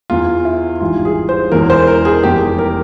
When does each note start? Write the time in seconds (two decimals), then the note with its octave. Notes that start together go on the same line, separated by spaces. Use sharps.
0.10 E2 E3 F4
0.45 E4
0.81 G#1 G2 E3 F4
1.05 G#4
1.29 C5
1.52 E1 E2 E3 A#4
1.70 C5
1.87 A#4
2.05 G#4
2.23 F1 E2 E3 G4
2.41 G4
2.58 A#4